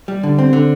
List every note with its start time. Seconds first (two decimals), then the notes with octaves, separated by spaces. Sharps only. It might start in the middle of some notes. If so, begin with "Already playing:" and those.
0.08 G3
0.23 D3
0.38 C4
0.53 D3